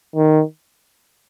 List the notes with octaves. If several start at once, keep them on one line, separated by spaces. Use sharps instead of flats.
D#3